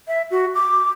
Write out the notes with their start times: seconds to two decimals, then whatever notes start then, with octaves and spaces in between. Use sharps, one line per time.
0.08 E5
0.31 F#4
0.55 D6